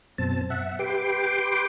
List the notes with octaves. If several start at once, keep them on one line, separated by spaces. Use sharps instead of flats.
F#2 B2 C4 A5
E5 F#5
G4 B4 G5 C6 D6